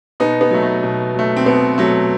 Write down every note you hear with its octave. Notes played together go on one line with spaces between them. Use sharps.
B2 B3 D#4
B3
F#3 A3
A3
B2
F#3 A3
C4
B2 B3
F#3 A3